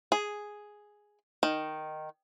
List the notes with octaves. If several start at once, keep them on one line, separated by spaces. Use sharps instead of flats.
G#4
D#3